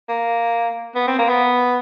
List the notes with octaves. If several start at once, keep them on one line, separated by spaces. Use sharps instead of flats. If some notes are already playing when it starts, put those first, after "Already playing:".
A#3
B3
C4
A#3
B3